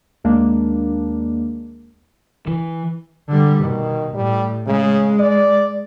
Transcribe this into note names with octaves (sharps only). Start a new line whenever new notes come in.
D#2 G#3 A#3 D4
E3
D3 G3
B2 D#3
A2 G3
C#3 G#3
D5